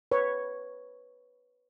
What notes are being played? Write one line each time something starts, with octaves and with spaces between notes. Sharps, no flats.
B4 C#5